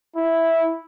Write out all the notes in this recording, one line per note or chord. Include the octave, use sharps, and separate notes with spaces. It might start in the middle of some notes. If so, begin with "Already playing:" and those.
E4